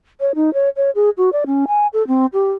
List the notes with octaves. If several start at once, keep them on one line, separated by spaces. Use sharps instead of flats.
C#5
D#4
C#5
C#5
G#4
F#4
D5
C#4
G#5
A4
C4
G4